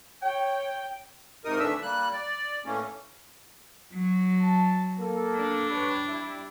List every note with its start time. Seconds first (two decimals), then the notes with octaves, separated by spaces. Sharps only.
0.22 C#5 G5
1.45 G#2 C3 D#4 A#4 D#6
1.59 D2 E3 A3 D4 E5 E6
1.82 G3 A#3 F#6
2.13 D5
2.66 A2 E3 A3 A#3 C#4
3.94 F#3
4.41 A5
4.99 A#3 A4
5.38 D4
5.70 G3 B4 C#5
6.08 G3 E4